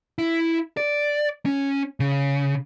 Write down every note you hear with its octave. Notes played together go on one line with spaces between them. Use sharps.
E4
D5
C#4
C#3